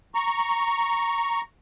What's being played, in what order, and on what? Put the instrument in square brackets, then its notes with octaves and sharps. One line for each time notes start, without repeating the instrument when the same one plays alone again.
[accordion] A#5 C#6